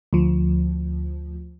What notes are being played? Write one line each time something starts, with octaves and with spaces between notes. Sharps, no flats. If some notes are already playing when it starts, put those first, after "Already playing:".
D2 F3